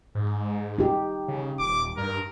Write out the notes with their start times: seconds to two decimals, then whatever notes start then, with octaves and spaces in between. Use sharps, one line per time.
0.15 G#2
0.78 D#4 G4
1.28 C#3
1.59 D#1 D6
1.97 G2 A#4